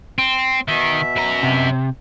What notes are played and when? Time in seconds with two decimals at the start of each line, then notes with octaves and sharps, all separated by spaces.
0.19 C4
0.68 B2 D#3 E5
1.16 F#2 A#5
1.43 C3